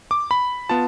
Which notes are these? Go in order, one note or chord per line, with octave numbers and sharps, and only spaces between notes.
D6
B5
B3 F4 A5